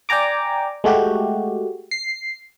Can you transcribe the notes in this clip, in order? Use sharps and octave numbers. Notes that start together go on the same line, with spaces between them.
D5 G5 G#5 A#5 D6
G#3 A3 F#4 G4
C7